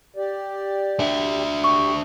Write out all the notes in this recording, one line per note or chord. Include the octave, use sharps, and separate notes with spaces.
G4 D5
D4 E5
G4 C#6